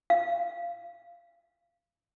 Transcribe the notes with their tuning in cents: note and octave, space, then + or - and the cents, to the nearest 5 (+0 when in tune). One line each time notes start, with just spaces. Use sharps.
F5 -20